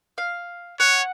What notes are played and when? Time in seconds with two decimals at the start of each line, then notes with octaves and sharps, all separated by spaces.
0.18 F5
0.80 C#5 F#5